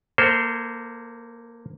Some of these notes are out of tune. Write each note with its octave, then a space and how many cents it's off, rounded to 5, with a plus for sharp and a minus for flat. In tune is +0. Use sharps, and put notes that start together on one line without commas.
A#3 +0 A4 +30 C5 -15